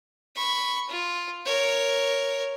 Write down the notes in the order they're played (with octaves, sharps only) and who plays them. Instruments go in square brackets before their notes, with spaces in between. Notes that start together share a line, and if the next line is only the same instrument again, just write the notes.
[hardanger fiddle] B5 C#6
F4
A#4 C#5